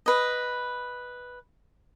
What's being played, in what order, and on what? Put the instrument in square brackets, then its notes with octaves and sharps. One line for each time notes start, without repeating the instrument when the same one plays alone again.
[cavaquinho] B4 D#5